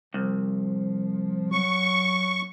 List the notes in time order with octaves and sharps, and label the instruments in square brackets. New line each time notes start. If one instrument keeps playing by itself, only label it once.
[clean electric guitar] C2 [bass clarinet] F3
[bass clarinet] F#3 [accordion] C#6